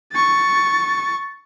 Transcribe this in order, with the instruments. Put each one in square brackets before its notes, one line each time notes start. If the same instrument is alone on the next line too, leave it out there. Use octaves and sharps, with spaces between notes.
[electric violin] C#6 A6